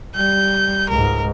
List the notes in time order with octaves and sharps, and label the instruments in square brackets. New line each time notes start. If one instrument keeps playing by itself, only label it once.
[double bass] G3 [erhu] G6
[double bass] C#2 G#2 [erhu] A#4